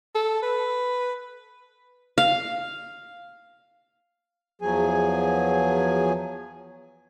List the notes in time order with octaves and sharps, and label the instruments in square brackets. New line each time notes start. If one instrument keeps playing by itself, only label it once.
[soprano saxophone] A4
B4
[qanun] F5
[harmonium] E2 F3 F#3 G#4 G#5